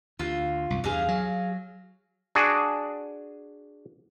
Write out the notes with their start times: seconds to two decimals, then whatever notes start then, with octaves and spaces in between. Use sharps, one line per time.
0.19 D2 F4
0.70 C2 F#2
0.84 E2 G2 G#4 F5
1.08 F#3
2.35 D4 F#4 G#4